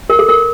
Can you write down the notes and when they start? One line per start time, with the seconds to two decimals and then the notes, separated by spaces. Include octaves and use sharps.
0.10 A#4
0.19 A4
0.29 A#4